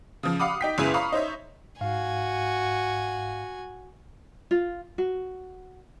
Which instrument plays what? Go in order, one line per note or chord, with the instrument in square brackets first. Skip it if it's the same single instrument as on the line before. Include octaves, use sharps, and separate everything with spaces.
[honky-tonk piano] C#3 F3
F5 F#5 B5 D6 D#6
D#4 G5 B6
F#1 C#2 C#3 E4 G#4 B4
F5 A#5 B5 C#6 D#6
D#4 C5 C#5 E5
[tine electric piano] G#2 F5 [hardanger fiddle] F#4 G#5
[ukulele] F4
F#4